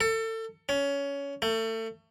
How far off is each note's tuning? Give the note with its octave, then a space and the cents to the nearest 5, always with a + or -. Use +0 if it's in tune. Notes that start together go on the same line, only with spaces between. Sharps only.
A4 +30
C#4 +20
A3 +30